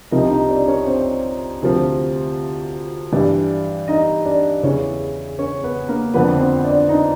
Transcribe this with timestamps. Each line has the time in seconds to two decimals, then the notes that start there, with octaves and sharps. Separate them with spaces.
0.11 C2 C3 F3 D#4 D#5
0.30 D#4 D#5
0.49 D4 D5
0.68 C#4 C#5
0.87 C4 C5
1.62 D2 C3 F3
3.12 G2 E3 D4 D5
3.88 D#4 D#5
4.25 D4 D5
4.63 E2 C#3 E3 C#4 C#5
5.39 C#4 C#5
5.64 B3 B4
5.89 A#3 A#4
6.14 F2 D3 F3 B3 B4
6.39 C4 C5
6.64 D4 D5
6.89 D#4 D#5